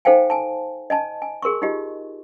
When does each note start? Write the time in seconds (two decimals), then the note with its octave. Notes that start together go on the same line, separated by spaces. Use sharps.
0.05 D#4 A4 C5 F5 G5 G#5
0.30 G#5 A5
0.90 D#5 G#5 A5
1.22 G#5
1.42 G#4 A#4 C6 C#6
1.62 D#4 F4 G4 D#5